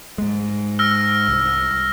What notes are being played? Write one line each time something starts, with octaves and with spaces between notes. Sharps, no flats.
G#2 G#3
E6 F6 A#6
C2